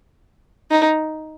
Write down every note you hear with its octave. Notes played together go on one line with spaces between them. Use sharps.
D#4